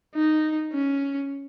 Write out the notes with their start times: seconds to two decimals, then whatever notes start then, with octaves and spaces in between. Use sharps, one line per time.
0.15 D#4
0.73 C#4